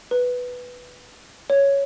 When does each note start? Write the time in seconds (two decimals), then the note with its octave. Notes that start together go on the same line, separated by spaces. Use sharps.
0.11 B4
1.50 C#5